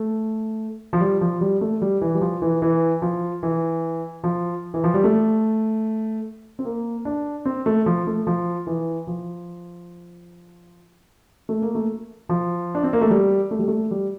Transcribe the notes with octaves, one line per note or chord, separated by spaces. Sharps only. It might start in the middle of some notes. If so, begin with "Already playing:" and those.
Already playing: A3
F3
G3
F3
G3
A3
G3
E3
G3
F3
E3
E3
F3
E3
F3
E3
F3
G3
A3
C4
A#3
D4
C4
A3
F3
A3
F3
E3
F3
A3
A#3
A3
F3
D4
C4
A#3
A3
G3
A3
G3
A3
G3